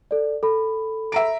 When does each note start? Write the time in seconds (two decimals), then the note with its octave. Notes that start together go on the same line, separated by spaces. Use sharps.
0.11 A4 D5
0.43 A4 B5
1.12 E5 A#5 D7